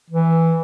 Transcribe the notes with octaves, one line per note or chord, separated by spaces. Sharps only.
E3